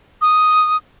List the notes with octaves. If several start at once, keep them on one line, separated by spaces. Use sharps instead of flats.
D#6